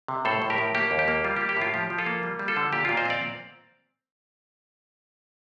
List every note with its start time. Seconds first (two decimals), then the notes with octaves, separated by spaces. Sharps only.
0.08 C3
0.25 A2 A4 C5
0.42 A2
0.50 G4 A#4
0.58 A2
0.75 A#3 G4
0.91 D#2
0.99 G4
1.08 A#3
1.24 G3 F4
1.36 G4
1.41 A#3
1.49 G4
1.57 A2 F4
1.74 F3 G4
1.90 F3
1.98 F4 A4
2.06 A#3
2.23 G3
2.39 G3
2.48 F4 A4
2.57 D3
2.72 A#2 G4
2.85 A#2 F4
2.97 C5 D#5
3.05 C4 D5 F5